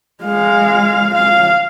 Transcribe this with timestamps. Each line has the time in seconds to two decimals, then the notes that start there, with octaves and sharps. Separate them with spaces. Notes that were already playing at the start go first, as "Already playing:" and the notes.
0.23 G#3 F5
1.14 F5